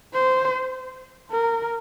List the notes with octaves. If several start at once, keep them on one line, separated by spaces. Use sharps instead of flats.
C5
A#4